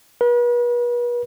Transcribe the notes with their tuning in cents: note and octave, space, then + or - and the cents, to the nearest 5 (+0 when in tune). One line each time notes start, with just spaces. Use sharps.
B4 -40